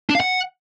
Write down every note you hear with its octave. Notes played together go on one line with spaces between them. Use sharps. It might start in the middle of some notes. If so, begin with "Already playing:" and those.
D4
F5
F#5